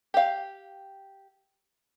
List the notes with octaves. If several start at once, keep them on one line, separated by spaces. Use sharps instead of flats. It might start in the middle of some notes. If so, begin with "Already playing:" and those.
G4 F5